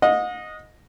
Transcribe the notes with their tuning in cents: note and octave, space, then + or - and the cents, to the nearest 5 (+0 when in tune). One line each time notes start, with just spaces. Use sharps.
D#5 +0 F#5 -45